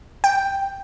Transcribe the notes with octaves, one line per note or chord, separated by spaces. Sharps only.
G5